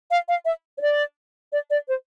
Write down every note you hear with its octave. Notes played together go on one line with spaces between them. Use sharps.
F5
F5
E5
C#5
D5
D5
D5
C5